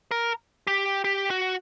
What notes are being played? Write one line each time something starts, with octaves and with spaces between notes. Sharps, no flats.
A#4
G4
G4
F#4